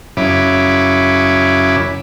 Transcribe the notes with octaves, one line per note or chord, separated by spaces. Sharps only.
F#2 C#3 C#4 E4 B5 D6